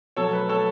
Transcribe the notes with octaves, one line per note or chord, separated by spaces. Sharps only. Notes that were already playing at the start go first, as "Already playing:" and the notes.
B2 F#3 A4 C#5
B4
A4 C#5